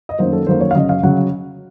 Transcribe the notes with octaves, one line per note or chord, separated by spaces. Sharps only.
D#5
F#2 D#3 F#3 A#3 C5
A4
F#2 D#3 F#3 A#3 C5
C#5
F5
F#2 C#3 F#3 D#5
F5
C#3 F#3 F#5